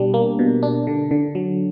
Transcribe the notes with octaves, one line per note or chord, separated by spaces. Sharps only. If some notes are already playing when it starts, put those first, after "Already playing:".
Already playing: B2 G3 D4
A#3
B2
D4
D3
D3
F#3